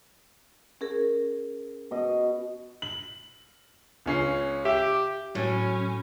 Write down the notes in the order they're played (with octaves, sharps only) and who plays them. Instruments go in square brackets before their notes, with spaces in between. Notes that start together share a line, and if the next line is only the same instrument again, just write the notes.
[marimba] C#4 G#4 A#4
[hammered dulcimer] B2 D#5
[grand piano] F#7
C#2 C#4 C7
[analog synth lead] G4 [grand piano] E5
[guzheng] A2 [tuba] F#3 [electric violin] C#4